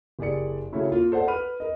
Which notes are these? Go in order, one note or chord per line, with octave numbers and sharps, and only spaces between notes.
F#1 G4 G#4 D5 C#7
C#3 A3 C#4 E4 F#4
A#3 F4
A4 C5 D5 F#5
B4 B5 F6 D#7
A#4 D#5